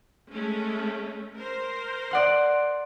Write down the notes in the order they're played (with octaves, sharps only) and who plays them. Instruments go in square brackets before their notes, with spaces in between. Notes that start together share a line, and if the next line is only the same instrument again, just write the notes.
[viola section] G#3 A3 C#4
A#4 C5
[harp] D5 F#5 C6